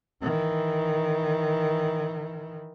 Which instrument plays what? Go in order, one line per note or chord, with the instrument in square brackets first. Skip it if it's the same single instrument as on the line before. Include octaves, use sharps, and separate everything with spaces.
[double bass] D#3 E3